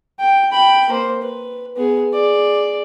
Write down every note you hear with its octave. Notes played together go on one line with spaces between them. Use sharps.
G5
G5 B5
A#3 C5
B4
B3 G#4
G#4 D5